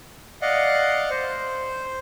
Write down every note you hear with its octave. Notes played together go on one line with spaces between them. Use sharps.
D5 D#5 F5 F#5
C5